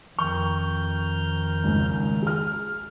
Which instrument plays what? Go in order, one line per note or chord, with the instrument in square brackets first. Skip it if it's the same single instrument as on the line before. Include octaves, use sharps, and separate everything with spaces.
[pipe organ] F2 F6 G6 [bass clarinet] D#3 [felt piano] C#6
[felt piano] G#1 C#2
G#4 F6